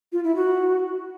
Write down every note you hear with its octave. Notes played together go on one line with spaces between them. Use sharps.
F4
E4
F#4